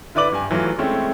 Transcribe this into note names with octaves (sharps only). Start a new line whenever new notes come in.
D3 E4 B4 D5 D6 F#7
G2 G#5
E3 F#3 A3 F4
G#3 A3 C4 C#4 E4